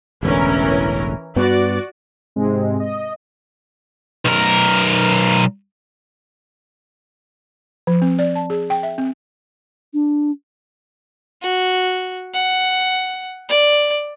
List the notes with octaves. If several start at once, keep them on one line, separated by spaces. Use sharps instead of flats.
E1 A1 D3 E3 C#4 A#4
G2 B3 F#4 D5
G#2 C3 G#3 C4
D#5
B1 A#4
F3
C4
D5
A5
G#4
G5
E5
C4
D4
F#4
F#5
D5